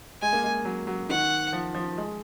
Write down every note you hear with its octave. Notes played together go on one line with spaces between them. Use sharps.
G#3 G#5
A#3
G#3
F#3
F#3
D#3 F#5
F3
F3
G#3